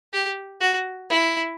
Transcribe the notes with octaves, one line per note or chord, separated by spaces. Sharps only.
G4
F#4
E4